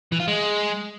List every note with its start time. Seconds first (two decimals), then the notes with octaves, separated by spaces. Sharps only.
0.12 E3
0.20 F4
0.28 G#3